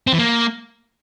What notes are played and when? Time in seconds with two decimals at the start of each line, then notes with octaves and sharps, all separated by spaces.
0.07 C4
0.13 E3
0.18 A#3